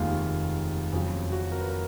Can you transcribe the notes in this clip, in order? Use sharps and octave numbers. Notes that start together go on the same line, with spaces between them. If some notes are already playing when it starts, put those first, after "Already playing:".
Already playing: F1 D#2 D#3 G#3 F4
F2 C#3 F#3 G#4
F#4
A#4
B4
A#4